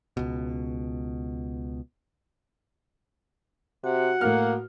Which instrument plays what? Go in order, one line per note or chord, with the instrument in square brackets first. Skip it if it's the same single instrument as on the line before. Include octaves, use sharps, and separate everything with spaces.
[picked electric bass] C#2 B2
[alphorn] C3 [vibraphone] F#4 [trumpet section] F#5
[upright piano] A2 A#4 F6 [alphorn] A#3